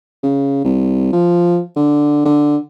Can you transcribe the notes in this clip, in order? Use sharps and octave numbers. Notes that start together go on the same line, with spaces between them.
C#3
C2
F3
D3
D3